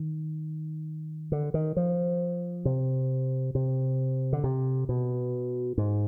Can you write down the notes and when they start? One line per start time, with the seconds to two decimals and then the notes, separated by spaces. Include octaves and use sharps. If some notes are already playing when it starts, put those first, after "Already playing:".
Already playing: D#3
1.32 D3
1.54 D#3
1.77 F3
2.65 C3
3.55 C3
4.33 D3
4.44 C3
4.89 B2
5.78 G#2